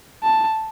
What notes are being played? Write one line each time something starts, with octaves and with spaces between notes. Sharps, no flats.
A5